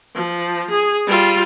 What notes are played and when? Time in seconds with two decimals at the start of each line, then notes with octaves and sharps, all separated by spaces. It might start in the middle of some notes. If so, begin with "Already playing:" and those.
0.16 F3
0.70 G#4
1.07 G3 F4